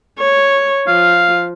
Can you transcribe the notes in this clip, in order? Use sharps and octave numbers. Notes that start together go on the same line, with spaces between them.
C#5
F3 F5